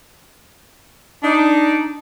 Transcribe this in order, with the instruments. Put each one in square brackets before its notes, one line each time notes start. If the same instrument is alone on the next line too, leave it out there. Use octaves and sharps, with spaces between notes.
[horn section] D4 D#4